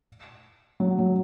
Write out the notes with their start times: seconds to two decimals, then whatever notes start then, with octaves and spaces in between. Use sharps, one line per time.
0.80 F#3
0.98 F#3